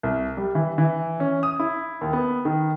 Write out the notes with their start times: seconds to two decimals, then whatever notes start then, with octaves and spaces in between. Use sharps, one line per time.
0.03 C2
0.37 G3
0.55 E3
0.78 E3
1.20 C#4
1.43 D#6
1.59 E4
2.01 D#2
2.13 B3
2.45 D#3